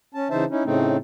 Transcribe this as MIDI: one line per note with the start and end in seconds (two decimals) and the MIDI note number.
0.14 0.28 61
0.14 0.28 81
0.30 0.45 49
0.30 0.45 52
0.30 0.45 63
0.30 0.45 72
0.30 0.45 76
0.30 0.45 81
0.50 0.63 61
0.50 0.63 63
0.50 0.63 64
0.65 0.96 45
0.65 0.96 49
0.65 0.96 57
0.65 0.96 60
0.65 0.96 63